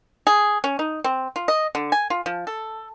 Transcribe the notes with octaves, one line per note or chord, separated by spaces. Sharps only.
G#4
C#4
D#4
C4
F4
D#5
D3
G#5
F4
F3
A4